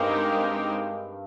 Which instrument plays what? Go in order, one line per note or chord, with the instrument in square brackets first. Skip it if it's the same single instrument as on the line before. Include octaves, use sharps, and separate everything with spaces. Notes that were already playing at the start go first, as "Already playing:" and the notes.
Already playing: [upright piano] G2 [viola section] G#3 C4 D#4 G4 A#4